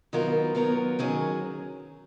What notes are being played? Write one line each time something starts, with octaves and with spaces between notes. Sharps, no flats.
D#3 F#3 B3 F4 A#4
D#3 F#3 B3 F4 A#4
D#3 F#3 C#4 G#4